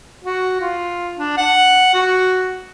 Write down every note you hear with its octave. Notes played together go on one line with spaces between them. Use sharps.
F#4
F4
D4
F#5
F#4